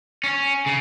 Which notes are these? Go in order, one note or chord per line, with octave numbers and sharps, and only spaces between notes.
C#4
C#3